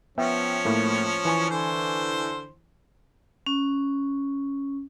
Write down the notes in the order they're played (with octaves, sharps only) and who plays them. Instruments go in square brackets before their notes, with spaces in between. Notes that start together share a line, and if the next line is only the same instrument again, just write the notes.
[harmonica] F3 C#4 [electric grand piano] B3 E5 G5
[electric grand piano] A2 A3 A#3
E3 G#5 C#6
[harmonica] D3 C5
[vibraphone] C#4